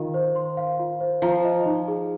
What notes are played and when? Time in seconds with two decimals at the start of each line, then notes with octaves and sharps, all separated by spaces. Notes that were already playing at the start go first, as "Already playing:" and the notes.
Already playing: D#3 F4 F5
0.14 C5
0.36 C6
0.57 F5
0.79 F4
1.01 C5
1.22 F3 A#5
1.45 D#5
1.66 D#4
1.88 G#4